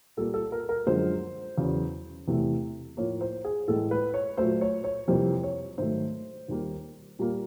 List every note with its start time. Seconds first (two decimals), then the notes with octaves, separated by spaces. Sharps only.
0.17 A#2 G3 A#3 A4
0.34 A4
0.52 A#4
0.69 A#4
0.86 F#2 D3 F3 G#3 C5
1.58 E2 C#3 F#3
2.28 E2 C3 E3 A3
2.97 A2 F3 A#3 C#5
3.21 C5
3.45 G#4
3.67 A2 E3 G#3 A4
3.91 B4
4.14 C#5
4.37 A#2 F#3 A3 C5
4.61 C#5
4.84 C#5
5.08 F2 C3 E3 G3 A#3 C5
5.43 C#5
5.78 G#2 D#3 F#3 A3 C5
6.48 D#2 D#3 G3 A#3
7.19 A#2 G3 A#3